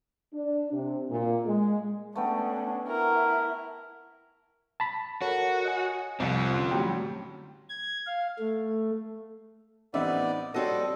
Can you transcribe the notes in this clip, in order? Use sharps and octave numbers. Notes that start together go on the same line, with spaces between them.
D4
C3
A#2
G#3
A3 B3 C#4 D4 G5
E4 A#4
A5 B5
F#4 A4 A#4 C#5
D#5 G#5
C2 F3 C4 F4
D3 C#4 C6
A2 F#3 G3 G5
G#6
F5
A3
A1 B3 C4 D#4 D5 E5
G3 C4 F#4 A4 C#5 D#5